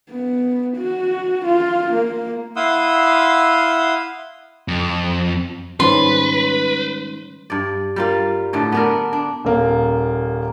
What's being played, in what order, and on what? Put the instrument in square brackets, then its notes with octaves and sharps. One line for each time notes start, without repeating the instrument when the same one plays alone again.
[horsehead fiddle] B3
F#4
F4
A#3
[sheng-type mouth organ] E4 F5 F#5 C6 D#6 E6
[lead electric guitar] F2
[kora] G#2 F4 [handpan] D#3 G3 C#4 [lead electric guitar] B4 [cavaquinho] C6
[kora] G2 D5
G3 A#3 F4
A2 D3 A3
B3 D4 A#4
D4
[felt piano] D#1 A#3